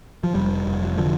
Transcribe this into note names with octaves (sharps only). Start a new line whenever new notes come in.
F3
F1 G3
F1
D3 F3